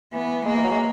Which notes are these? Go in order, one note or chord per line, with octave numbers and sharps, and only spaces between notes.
E3 B3
G#3 A#3
E3
F#3
G#3